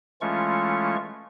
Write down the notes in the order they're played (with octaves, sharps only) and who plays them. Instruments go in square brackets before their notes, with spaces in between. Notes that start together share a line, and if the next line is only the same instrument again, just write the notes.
[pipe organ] E3 G#3 A3 C#4 F4 C#6